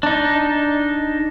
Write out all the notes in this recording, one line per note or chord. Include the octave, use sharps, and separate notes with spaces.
D4 D#4